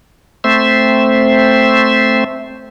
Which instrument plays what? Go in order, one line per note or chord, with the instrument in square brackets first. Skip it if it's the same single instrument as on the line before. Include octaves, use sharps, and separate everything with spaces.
[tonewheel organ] A3 C4 C5 E5